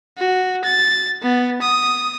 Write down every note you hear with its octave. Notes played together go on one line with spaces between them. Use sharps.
F#4
A6
B3
D#6